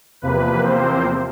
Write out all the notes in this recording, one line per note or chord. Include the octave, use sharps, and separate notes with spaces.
E2 C3 F3 A#3 B4
C4 C5